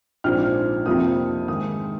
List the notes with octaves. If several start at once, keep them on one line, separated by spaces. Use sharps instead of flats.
A#1 G#2 F3 C4 F6
F2 C3 F3 A#3 D#6
G#2 D#3 G#3 D#6